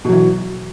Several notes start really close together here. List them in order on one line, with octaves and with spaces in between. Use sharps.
B2 F#3 E3